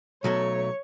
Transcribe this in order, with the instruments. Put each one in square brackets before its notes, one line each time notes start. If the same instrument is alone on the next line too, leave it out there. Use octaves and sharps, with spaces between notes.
[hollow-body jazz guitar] B1 F#3 A3 [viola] C#5